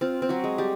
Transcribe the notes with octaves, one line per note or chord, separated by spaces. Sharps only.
C4 F4
C4
F#3 F#4
G#3
G3 G4